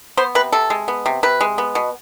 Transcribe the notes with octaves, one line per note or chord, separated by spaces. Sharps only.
B3 C5
C3 B4
C3 A4
G#3
B3
C3
C3 B4
G#3
B3
B2